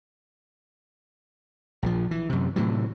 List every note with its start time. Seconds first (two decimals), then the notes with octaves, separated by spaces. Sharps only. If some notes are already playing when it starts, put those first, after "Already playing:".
1.83 A#1 C#3 F3
2.11 E3
2.29 F#2 C3
2.56 A2 C3 E3 F#3